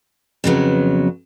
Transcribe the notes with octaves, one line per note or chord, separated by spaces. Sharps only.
F2 C#3 F#3 B3